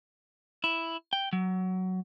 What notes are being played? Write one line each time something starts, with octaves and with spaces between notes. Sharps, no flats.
E4
G5
F#3